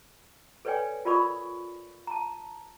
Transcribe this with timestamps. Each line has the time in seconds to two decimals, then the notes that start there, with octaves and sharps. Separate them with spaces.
0.65 A4 B4 C#5 D5 G5 G#5
1.05 F4 A#4 D5 B5 C#6 D#6
2.07 A5 A#5